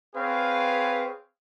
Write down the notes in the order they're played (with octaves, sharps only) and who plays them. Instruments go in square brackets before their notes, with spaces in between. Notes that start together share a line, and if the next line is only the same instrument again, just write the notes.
[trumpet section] C4 G#4 B4 C#5 F5